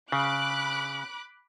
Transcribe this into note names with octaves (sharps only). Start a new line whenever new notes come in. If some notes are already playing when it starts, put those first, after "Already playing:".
C#3 B5 D6 F#6